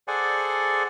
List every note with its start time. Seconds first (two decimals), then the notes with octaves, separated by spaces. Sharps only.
0.08 G#4 A4 C5 D5 F#5 G#5